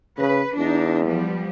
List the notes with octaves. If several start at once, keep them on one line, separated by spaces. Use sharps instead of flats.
C#3 B4
E2 D4 D#4
F3 G3 B3